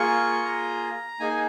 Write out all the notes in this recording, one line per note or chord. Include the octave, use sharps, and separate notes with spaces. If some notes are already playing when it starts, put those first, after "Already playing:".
Already playing: A#3 F4 G#4 C#6
A#5
A#3 D#4 G#4 G#5